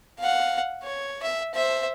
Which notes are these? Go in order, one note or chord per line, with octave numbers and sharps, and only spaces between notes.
F5 F#5
C#5
E5
C5 E5